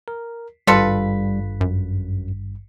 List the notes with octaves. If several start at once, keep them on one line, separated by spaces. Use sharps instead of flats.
A#4
G#1 G2 G3 F4 A4 B4 B6
F#2